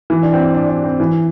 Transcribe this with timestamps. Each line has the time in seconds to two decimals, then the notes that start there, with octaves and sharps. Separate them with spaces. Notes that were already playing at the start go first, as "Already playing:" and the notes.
0.10 E3
0.23 D4
0.33 C4
0.55 D4
0.70 D4
0.84 C4
1.00 E3